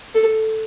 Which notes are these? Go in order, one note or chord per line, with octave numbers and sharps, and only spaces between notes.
A4